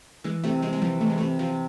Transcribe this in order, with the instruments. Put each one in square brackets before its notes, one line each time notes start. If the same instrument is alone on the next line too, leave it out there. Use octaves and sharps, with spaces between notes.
[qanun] E3 [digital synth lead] G#3
[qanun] C3 [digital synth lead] A3
[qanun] C3 [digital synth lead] G#3
[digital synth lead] G#3
[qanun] E3 [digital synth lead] F3
[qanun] E3 [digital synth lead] A3
[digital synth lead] G#3
A3
[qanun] C3
[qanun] C3 [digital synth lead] F3